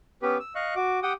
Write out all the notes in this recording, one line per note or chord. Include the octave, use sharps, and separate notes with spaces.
B3 C#4 G4 B4
E6
D#5 F5 C#6 F#6
F#4 D6
G4 F#5 G5 D#6